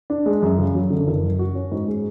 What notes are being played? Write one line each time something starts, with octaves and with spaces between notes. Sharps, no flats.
D4
G#3
F#2
C#3
F#3
D3
F#1
F#2
F#4
C#4
G#2
G#3